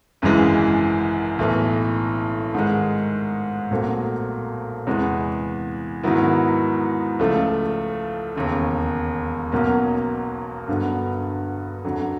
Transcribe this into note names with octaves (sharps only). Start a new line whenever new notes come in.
G#1 F#2 C#3 E3 G#3
B1 A2 E3
G#2 D#3 G#3
B1 A#2 F#3 A3 C4
E2 C3 E3 G#3 B3
G#2 D#3 F#3 B3 E4
C#2 C#3 F3 A3
E1 D#2 C#3
B1 B2 F#3 A#3 C#4
G2 D3 F#3 B3
F2 D3 F#3